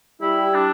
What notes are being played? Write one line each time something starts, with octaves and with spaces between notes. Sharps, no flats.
G3 E4
D4